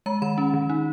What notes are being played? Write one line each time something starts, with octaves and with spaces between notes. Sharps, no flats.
G#3 A#5
D#3 B5
C#4
D#3
D#4